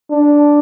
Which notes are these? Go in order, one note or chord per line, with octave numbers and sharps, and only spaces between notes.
D4